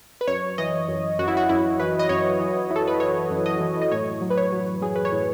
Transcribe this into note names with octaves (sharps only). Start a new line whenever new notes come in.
B4
F#2 C#5
E3 D#5
F#2
F#2 F#4
E4
F#4
F#2 E4
E3 B4
D#5
F#2 C#5
E3
E3
A4
B4
E3 C#5
F#2
D#5
E3
D#5
A2 C#5
F#3
B4
C#5
F#3
F#3 G#4
B4
C#5
A2